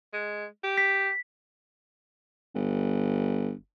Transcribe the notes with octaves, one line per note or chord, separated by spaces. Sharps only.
G#3
G4
B6
G1